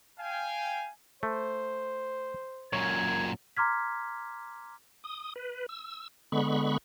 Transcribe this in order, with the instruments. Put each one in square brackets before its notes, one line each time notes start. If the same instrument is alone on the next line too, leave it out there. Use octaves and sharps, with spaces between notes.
[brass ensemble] F5 G5 G#5
[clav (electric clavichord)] A3 [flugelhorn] C5
[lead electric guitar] F#2 A#2 [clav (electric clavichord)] C#5 [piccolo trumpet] G#6
[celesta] A#5 C6 D6 F6 G#6 B6
[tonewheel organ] D#6
B4
E6
D3 G#3 B3 B5 C#6